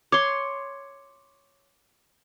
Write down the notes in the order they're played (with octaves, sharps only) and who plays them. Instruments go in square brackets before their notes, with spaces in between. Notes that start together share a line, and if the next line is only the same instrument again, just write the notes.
[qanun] C#5 C6 [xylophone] D6